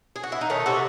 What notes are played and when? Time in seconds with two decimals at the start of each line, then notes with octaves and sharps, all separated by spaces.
0.16 G#4
0.23 F#4
0.32 E4
0.41 D#4
0.50 D#3 A3 C#4
0.66 C3 F#4 A4